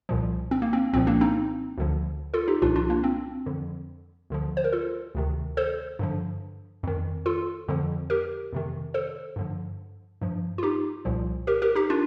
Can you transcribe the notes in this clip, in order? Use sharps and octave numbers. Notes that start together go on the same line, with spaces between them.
C2 A#2 F3
C4
A#3
C4
C2 A#2 F3 C4
A#3 D4
C4 D#4
D2 D3 F3
F4 A4
D#4 G4
C2 A#2 F3 D4 F4
D4 F4
A#3 D4
C4
F2 D3 F3
D2 D3 F3
C5
A#4
F4 A4
D2 C3 D#3
A4 C5
G2 D3 F3
F2 D#3
F4 A4
F2 D3 F3
G4 A#4
F2 C3 D#3
A4 C5
G2 D3 F3
G2 F3
F4
D#4 G4
C2 A#2 F3
G4 A#4
G4 A#4
D#4 G4
D4 F4